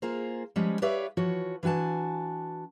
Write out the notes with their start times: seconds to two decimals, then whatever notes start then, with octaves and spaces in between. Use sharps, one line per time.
0.02 A#3 F4 G#4 A#4 C5
0.56 F3 G3 G#3 C#4
0.82 G4 B4 C#5 D5 E5 F5
1.17 E3 F3 F#4 C#5
1.63 E3 D4 F#4 G#5 A5